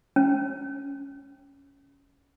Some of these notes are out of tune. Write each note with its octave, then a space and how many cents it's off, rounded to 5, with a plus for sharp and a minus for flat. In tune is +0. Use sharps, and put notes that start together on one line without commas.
C#4 +10